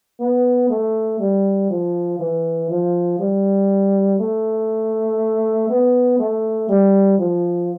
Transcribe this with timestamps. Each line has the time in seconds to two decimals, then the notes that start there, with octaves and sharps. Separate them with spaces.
0.20 B3
0.70 A3
1.20 G3
1.70 F3
2.19 E3
2.70 F3
3.19 G3
4.19 A3
5.69 B3
6.19 A3
6.69 G3
7.18 F3